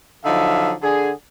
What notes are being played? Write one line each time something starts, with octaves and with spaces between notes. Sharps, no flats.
D3 F3 F#3 D#4 E5 F5
D3 G#4